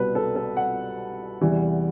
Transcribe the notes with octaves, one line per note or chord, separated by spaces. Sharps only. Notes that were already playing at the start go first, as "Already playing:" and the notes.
Already playing: C2 B2 G3 B4
A4
A4
F#5
E2 C3 E3 G3